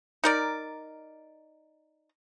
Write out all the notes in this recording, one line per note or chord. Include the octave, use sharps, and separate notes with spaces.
D#4 A#4 D5